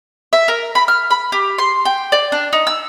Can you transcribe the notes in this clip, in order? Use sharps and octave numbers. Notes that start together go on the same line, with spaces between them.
E5
A#4
B5
F6
B5
G4
C6
G5
D5
D4
D#4
E6